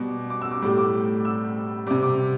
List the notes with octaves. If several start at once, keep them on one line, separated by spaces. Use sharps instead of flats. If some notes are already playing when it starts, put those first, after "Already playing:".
Already playing: B2 G3 D6
D6
E6
D6
A2 G3 D6
D6
E6
C3 G3 D6
D6